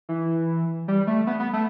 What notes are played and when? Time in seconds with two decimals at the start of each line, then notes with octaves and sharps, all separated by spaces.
0.09 E3
0.88 G3
1.07 A3
1.27 B3
1.40 B3
1.53 A3